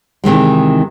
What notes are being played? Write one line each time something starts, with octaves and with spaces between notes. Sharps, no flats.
C3 D#3 E3 G#3